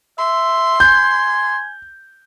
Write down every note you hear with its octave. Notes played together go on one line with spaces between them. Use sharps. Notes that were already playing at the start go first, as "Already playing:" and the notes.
E5 C6
G#5 G6